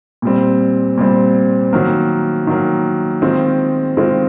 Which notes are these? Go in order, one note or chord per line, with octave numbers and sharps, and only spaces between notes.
A#2 G3 C4
A#2 G3 C4
D#3 F#3 A#3
D#3 F#3 A#3
D#3 G#3 C4 F4
D#3 G#3 C4 F4